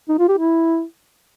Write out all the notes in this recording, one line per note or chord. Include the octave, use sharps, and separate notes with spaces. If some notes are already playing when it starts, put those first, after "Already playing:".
D#4
F4
G4
E4